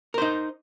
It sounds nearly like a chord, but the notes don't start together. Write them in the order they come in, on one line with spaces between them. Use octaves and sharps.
A#4 C5 D#4